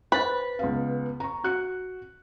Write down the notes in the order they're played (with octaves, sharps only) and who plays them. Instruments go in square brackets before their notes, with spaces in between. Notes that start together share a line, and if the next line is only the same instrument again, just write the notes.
[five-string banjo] B4 [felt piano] C5 A6
[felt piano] C#2 B3 F5
A#5 C#6
F#4 F#6 C#7